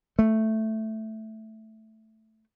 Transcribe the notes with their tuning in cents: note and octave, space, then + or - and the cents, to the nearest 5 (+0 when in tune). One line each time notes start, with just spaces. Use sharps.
A3 +0